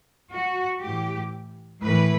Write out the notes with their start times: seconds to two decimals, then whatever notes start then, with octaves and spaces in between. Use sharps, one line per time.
0.31 F#4
0.81 A2 E3 G4
1.82 A2 E3 B4